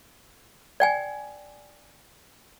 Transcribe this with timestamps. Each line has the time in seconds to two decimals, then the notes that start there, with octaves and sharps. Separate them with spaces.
0.80 D5 G5 G#5